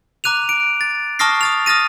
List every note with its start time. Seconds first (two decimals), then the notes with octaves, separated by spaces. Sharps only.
0.24 A#5 D6 F#6 D#7 F7
0.49 D7
0.81 A6
1.19 A5 C#6 D#6 F6 A#6 C7
1.41 D#6 A6 F7
1.66 D#6 F6 A6 A#6 D#7